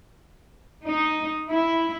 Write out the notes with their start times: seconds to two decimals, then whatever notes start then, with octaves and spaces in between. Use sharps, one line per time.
0.84 D#4
1.49 E4